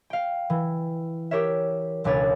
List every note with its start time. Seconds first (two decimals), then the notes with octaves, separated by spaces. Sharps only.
0.10 F5 G5
0.50 E3
1.31 G4 A#4 C#5 E5
2.04 E1 C#2 D4 B4 C#5 A6